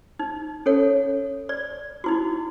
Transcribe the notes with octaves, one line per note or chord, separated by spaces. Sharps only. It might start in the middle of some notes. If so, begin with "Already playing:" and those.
D#4
C#4 A4 C#5 F#5
D5
D#4 E4 F#4